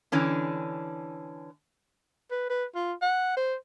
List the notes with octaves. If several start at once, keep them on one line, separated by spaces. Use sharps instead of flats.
D3 E3 C#4 D4
B4
B4
F4
F#5
C5